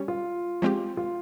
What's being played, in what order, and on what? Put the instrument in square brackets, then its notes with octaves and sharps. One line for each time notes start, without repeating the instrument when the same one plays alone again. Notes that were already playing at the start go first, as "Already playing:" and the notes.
Already playing: [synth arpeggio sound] G3 C#4 C#5
[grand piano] F4
[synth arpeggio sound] F3 G#3 C4 G4
[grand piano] F4